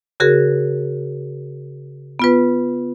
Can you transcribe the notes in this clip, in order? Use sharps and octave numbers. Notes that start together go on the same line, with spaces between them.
C#3 F#4 G#4 A#4
B3 F4 B4